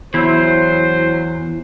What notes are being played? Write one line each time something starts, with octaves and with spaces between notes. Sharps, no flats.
E2 F#3 E4 C5